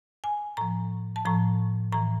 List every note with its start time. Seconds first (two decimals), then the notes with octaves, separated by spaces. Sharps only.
0.24 G#5
0.57 A2 F3 A#5
1.16 A5
1.25 A2 F3 A#5
1.92 A2 E3 A#5